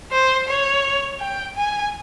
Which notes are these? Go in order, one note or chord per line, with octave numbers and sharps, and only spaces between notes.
C5
C#5
G5
G#5